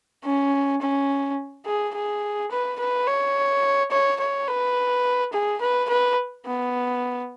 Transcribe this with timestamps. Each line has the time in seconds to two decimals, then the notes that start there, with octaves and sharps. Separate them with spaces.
0.24 C#4
0.81 C#4
1.66 G#4
1.95 G#4
2.51 B4
2.79 B4
3.07 C#5
3.91 C#5
4.20 C#5
4.48 B4
5.33 G#4
5.61 B4
5.89 B4
6.45 B3